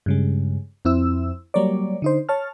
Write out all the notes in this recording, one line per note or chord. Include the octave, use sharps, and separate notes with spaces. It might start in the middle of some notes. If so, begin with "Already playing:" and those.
G2 C#3 G#3
F2 C4 E4 E6
F#3 G3 A#3 A#4 C#5 D5
D3 D#4 C5
C#5 A5 F6